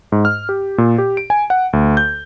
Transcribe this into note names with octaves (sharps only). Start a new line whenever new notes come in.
G#2
F6
G4
A#2
G4
D7
G#5
F#5
D2
G6